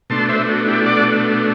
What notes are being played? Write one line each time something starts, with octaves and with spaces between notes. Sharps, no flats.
B2 A3 D4 A5 C6
C5 E5
F#4
E4 G4
D5 F#5